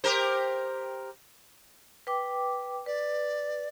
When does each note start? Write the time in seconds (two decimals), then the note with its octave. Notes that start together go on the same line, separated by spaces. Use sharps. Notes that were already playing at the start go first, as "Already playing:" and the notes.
0.04 G4 A#4 C5
2.07 B4 G5 D6
2.86 B4 D5